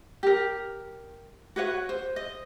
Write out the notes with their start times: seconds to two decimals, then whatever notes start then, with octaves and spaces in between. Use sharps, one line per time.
0.23 G4 A#4
1.56 F#4 B4 C#5 F#5
1.89 C5
2.16 D#5